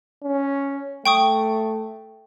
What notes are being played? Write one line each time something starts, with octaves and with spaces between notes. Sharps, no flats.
C#4
A3 G5 C#6 D#6